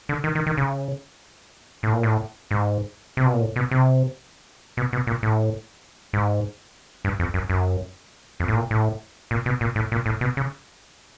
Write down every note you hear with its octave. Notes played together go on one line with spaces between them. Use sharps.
D3
D#3
D#3
D#3
C#3
A2
A#2
A2
G#2
C3
B2
A#2
A2
B2
C3
B2
B2
A#2
A2
G#2
G2
F2
F#2
F#2
F2
A2
A#2
A2
A#2
B2
A#2
A2
A#2
A2
B2
C#3